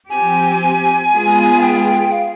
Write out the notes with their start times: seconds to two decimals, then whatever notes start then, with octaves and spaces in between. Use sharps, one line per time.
0.10 F3 C4 G4 G#5
1.11 G#3 B3 F4 G#4
1.62 G5
2.12 F5